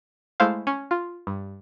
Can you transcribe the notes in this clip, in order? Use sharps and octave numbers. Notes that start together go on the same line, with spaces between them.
G#3 A3 E4 C5 F5
C#4
F4
G2